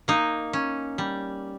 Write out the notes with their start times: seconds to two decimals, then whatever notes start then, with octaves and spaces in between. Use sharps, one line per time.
0.08 A#3 D#4
0.53 C#4
0.98 G3